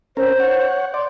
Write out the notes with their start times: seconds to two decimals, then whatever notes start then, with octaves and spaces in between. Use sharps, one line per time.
0.17 C#4 A#4 C5
0.40 C#5 F#5
0.94 D5 C6